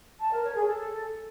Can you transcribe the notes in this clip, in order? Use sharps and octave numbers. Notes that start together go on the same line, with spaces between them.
A5
A#4
C#5
G#4
A4